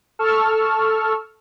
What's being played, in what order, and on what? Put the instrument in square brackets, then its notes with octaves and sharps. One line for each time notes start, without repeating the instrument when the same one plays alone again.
[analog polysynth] A4 A5 C#6 E6 F6